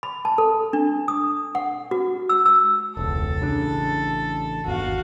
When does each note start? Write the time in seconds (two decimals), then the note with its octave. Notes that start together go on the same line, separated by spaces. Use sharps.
0.03 B5
0.25 A5
0.38 A4
0.73 D4
1.08 D#6
1.55 F#5
1.91 F#4
2.29 E6
2.46 E6
2.97 E1 C#2 A4
3.40 A1 C#3 D4
4.66 G1 D#2 F#4 F5